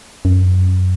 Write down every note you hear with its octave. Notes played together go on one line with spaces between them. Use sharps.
F#2